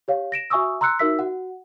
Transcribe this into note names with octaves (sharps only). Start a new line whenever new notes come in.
G4 C#5 F5
A#6 D7 E7
F#4 E5 G#5 C#6 D#6 E6
A#5 C6 E6 F#6 C#7
D#4 F#4 A#4 E5 E6 B6
F#4 F#5